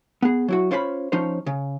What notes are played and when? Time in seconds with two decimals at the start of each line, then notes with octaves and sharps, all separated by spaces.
0.22 B3 G#4
0.48 F#3 E4 F#4
0.71 C#4 F4 C5 C#5 G5 B5
1.12 F3 C#4 D#4 C5 C#5
1.46 C#3